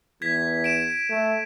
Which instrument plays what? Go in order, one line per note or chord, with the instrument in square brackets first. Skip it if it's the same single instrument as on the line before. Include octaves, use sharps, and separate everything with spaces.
[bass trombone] E2 [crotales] G#6 B6
[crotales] D7 E7
[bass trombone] A3